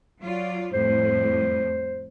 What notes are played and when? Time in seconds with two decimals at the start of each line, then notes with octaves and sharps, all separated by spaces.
0.22 F#3 F4 D5
0.74 F2 A2 G3 C5